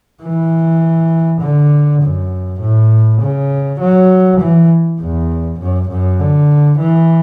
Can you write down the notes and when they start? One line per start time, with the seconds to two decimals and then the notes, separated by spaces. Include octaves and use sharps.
0.23 E3
1.42 D3
2.02 F#2
2.61 A2
3.22 C#3
3.80 F#3
4.40 E3
5.01 E2
5.59 F#2
5.90 F#2
6.20 D3
6.79 E3